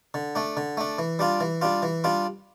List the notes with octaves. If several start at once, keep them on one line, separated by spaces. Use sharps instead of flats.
D3
A3 D4
D3
A3 D4
E3
G3 D4 F4
E3
G3 D4 F4
E3
G3 D4 F4